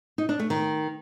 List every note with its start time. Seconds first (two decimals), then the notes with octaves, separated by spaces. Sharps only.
0.18 D#4
0.29 D4
0.39 A3
0.50 D#3